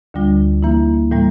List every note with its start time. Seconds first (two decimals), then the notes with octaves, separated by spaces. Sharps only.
0.14 D2 D3 G3 D4 F4
0.63 E3 A#3 E4
1.11 A2 E3 G3 A#3